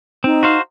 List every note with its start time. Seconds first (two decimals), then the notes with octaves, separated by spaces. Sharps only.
0.24 C4 D#4
0.43 F#4 C5 F5